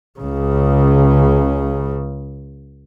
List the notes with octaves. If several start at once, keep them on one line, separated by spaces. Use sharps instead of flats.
C#2 C#3